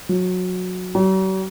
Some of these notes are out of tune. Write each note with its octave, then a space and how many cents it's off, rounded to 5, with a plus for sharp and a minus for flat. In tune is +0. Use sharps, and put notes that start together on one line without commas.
F#3 -20
F#3 +45